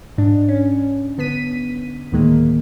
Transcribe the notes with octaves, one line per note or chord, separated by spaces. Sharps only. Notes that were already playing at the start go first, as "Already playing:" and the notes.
G#2 D4
C#4
D3 B3 B6 D#7
D2 A2 D#3 G#3 A#3